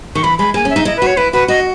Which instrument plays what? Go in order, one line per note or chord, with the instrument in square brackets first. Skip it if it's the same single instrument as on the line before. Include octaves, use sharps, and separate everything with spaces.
[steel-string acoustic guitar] D#3 [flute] C#6
[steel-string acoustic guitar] E3 [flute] B5
[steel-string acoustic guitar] G#3 [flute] B5
[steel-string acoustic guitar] A#3 [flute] G#5
[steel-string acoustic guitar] C#4
[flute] E5
[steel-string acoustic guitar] D#4
[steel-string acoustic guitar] E4 [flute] D#5
[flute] B4
[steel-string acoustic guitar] F#4 [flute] C#5
[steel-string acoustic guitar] E4 [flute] B4
[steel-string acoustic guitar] F#4 [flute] B4
[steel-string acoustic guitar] F#4 [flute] D#5